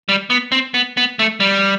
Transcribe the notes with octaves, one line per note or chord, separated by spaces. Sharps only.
G3
B3
C4
B3
B3
A3
G3